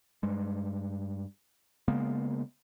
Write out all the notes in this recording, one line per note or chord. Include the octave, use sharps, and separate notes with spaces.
G2 G#3
C#3 G#3 A#3 B3